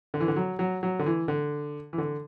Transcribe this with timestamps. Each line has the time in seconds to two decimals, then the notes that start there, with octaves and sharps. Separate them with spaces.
0.14 D3
0.20 E3
0.28 D3
0.36 F#3
0.59 F#3
0.83 F#3
0.99 D3
1.06 E3
1.28 D3
1.93 E3
1.98 D3